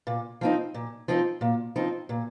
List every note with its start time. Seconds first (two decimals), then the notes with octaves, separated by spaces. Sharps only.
0.07 A#2
0.41 F3 C4 D#4
0.74 A#2
1.08 F3 C4 D#4
1.41 A#2
1.76 F3 C4 D#4
2.09 A#2